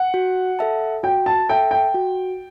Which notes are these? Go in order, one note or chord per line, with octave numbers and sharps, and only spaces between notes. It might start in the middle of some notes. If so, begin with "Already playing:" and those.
Already playing: F#5
F#4
A4 E5 A5
F#4 G5
A5
A4 E5 G5 A5
G5
F#4